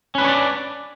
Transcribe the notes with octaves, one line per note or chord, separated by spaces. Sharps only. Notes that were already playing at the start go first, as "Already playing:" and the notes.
C#4 D4 B4 C#5 D5